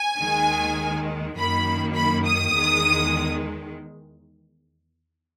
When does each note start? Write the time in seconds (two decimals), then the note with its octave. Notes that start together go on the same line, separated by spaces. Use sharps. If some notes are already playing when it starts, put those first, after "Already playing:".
Already playing: G#5
0.20 D#2 D#3 G#3
1.37 F#2 D#3 A#3 B5
1.95 B5
2.25 D#6
2.54 E2 D#3 G#3